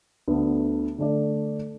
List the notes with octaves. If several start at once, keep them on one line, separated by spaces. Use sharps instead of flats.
D2 D3 B3
D3 A3 D4 A4 D5